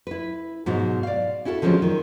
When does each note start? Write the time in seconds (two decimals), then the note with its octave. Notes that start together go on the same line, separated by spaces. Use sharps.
0.07 E4 B4
0.66 G#2 B2 F#3 G#3
1.03 D5 F5
1.45 C#4 E4 F#4 G4 A4
1.62 D3 F3 F#3 G#3 C4 C#4
1.82 D#3